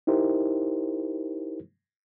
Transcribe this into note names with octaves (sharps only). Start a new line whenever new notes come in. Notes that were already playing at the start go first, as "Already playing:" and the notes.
D#4 E4 G4 A#4 C5